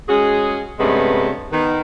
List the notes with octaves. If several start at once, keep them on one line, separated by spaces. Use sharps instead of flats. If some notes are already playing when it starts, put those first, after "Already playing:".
G#3 C#4 F#4 G#4
G2 C3 G#3 A3 B3 C#4
D#3 B3